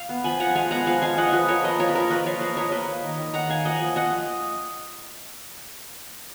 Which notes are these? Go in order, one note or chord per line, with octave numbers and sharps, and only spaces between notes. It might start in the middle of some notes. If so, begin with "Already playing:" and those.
Already playing: F5
B3
F3 G#5 B5
F3 F#5 A#5
G#3 F5 G#5
B3 F#5 A#5
F3 F5 G#5
G#3 F5 G#5
F3 D#5 F#5
F3 B4 D#5
F3 A#4 C#5
A#3 B4 D#5
F3 A#4 C#5
B4
A#3 A#4 C#5
F3 B4 D#5
F3 C#5 F5
A#3 B4 D#5
A#3 A#4 C#5
A#3 B4 D#5
A#3
D#3
D#3
D#3 F#5 A#5
A#3 F5 G#5
F3 D#5 F#5
F3
F3 D#5 F#5